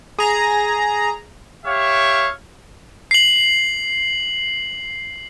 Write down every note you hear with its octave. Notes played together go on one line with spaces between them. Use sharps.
G#4 A#5
G4 C#5 E5 F5
C7 F#7